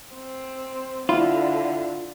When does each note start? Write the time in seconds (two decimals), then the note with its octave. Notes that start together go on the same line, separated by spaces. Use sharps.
0.15 C4
1.09 D3 E4 F4 C6